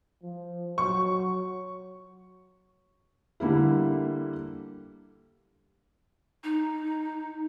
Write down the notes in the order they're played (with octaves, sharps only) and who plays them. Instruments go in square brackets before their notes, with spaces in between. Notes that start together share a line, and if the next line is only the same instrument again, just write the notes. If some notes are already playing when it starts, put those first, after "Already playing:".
[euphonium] F3
[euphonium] F#3 [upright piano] C#6
[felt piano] D3 G3 A#3 E4
[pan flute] D#4